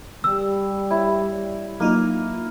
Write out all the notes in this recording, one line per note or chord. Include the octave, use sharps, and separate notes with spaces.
G3 E6
E4 C#5
F#3 A#3 D#4 F4